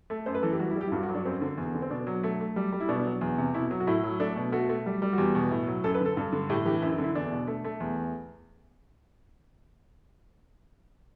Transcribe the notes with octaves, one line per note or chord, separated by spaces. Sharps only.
A3
F#2 C5
B4
E3 A4
G4
G3 F#4
E4
G3 G4
E4
G2 F#4
F#4
F#3
D4
F#2 C4
D3
E2
D3
C4
B2 D4
F#3
A3
A3
G3
G3
E4
B2 D4
D4
F#3
E2
C3
B2 E4
F#3
F#4
A2 E4
F#3
A3 D4
B2
A3 F#4
A3
G3
G3
F#4
E2 G4
B2
A2
F#3
F#2 A4
B4
D3 A4
G2
D3
A2 G4
E3 G4
F#2 E4
E4
D3
E4
E2 D4
B2
A3
A3
E2